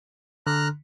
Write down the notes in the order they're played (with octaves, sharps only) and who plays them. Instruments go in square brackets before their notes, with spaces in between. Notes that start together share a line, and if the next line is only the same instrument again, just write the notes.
[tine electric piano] D3 [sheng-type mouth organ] A#5 F6 F#6